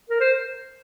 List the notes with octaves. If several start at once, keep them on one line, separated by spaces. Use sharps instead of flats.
A#4
C5